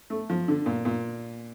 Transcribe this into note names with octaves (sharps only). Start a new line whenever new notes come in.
A3
F3
D3
A#2
A#2